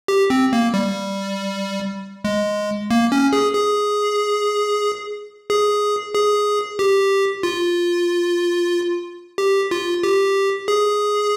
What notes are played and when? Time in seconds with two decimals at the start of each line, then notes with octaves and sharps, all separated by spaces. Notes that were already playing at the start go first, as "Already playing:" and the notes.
0.08 G4
0.30 C4
0.53 A#3
0.74 G3
2.24 G#3
2.91 A#3
3.12 C#4
3.33 G#4
3.55 G#4
5.50 G#4
6.14 G#4
6.79 G4
7.43 F4
9.38 G4
9.71 F4
10.03 G4
10.68 G#4